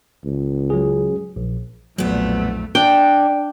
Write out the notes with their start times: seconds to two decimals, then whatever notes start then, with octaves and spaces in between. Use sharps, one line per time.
0.25 C#2
0.70 F#3 C#4 G#4
1.36 A#1
1.98 B1 F2 A#2 F#3 A3 B3
2.75 D4 G5